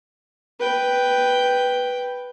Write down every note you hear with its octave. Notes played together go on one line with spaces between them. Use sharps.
B4 G5